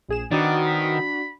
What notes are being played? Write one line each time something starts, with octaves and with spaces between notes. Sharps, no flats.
A#1 G#4 E7
D#3 B3 C4 D4 D#4 F#4 D5
B5